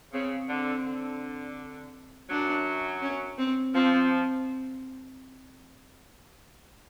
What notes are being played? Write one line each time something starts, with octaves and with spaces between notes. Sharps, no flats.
C#3 C4
D3 C4
D3
F#2 F#3 D4
C#4
C4
F3 C4